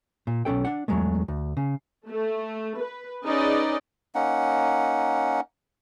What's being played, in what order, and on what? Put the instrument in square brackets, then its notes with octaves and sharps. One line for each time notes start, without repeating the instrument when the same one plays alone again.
[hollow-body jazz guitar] A#2
B1 E2 C#4 A4 G5
D4 F#5
E2 F#3 G#3 A3
D2
C#3
[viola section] A3
B4
C#4 D#4 G#4 B4 D5 D#5
[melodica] A#3 C#4 D#4 F#5